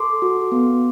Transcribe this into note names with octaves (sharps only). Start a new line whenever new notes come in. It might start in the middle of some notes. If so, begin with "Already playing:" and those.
Already playing: A4 C6 D6
F#4
B3